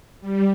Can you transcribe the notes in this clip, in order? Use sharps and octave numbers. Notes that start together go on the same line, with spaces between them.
G3